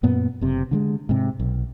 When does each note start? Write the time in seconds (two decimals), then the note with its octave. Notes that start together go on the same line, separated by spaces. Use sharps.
0.03 F#2 A#2 B3
0.41 F#1 C3
0.71 D3 G3 G#3
1.09 G#2 C3
1.40 B1